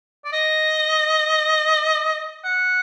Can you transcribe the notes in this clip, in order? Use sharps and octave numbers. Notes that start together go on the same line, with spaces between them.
D5
D#5
F#5